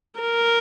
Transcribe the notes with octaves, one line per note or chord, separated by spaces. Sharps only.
A#4